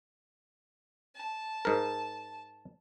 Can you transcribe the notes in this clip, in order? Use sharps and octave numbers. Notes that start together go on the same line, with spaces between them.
A5
G#2 A#4